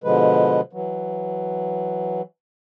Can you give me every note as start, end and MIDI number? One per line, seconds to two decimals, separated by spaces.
0.04 0.61 47
0.04 0.61 50
0.04 0.61 53
0.04 0.61 56
0.04 0.61 71
0.73 2.22 52
0.73 2.22 54